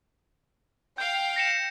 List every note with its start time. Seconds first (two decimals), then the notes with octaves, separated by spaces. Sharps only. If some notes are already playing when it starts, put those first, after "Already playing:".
0.98 F5 G5 G6
1.36 A#6 C#7 E7